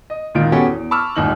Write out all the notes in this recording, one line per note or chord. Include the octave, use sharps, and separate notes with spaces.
D#5
C#2 A#2 D#3 F4 D7
B3 C#4 F#4 G4 A4 C#5
E2
A5 B5 C#6 D6 E6 F6
D#1 G#1 D#2 D#4 F#7